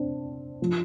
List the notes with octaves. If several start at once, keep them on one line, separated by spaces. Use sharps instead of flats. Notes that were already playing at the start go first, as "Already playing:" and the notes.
Already playing: C4 D4
F3